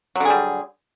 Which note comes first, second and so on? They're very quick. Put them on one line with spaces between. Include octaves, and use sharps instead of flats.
F#3 D3 G#4 G3